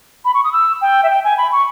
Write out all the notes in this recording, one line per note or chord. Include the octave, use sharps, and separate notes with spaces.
B5
C#6
D#6
E6
G5
E5
G5
G#5
B5
C#6